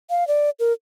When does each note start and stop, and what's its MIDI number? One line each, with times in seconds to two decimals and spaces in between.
0.10 0.27 77
0.28 0.50 74
0.60 0.73 70